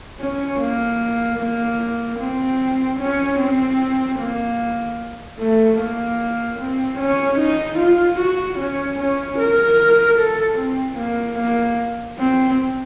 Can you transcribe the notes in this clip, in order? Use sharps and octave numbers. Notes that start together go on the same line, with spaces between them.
C#4
A#3
A#3
C4
C#4
C4
A#3
A3
A#3
C4
C#4
D#4
F4
F#4
C#4
C#4
A#4
A4
C4
A#3
A#3
C4